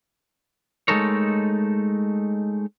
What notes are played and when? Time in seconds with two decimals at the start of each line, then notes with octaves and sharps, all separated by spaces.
0.88 G#3 A3 D#4 A4 A#4 C#5